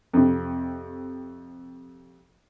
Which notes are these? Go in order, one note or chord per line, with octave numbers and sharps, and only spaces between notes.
F2 C3